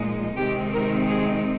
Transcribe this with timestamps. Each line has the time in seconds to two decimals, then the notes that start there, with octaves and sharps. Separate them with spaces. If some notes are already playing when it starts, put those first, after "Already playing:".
Already playing: A#2 F3 G#3 D#4
0.36 C3 D#3 G#3 C4 D#4 G4
0.73 A#4
1.10 G#4